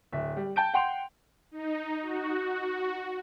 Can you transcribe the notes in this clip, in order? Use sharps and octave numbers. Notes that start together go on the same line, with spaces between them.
D1 E5
G3
G5 A5 G6 D7
F#5 G5 C6 F7
D#4
F#4